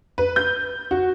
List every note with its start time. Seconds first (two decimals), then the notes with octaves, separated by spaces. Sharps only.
0.18 B4
0.36 G6
0.91 F#4